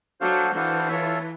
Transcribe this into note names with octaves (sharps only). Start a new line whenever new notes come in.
F#3 D4 F#4 A4 C5 F5
E3 D4 F#4 A4 C5 F5
F4 A4 C#5 E5